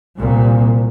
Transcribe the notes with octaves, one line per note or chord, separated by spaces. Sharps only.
C2 A#2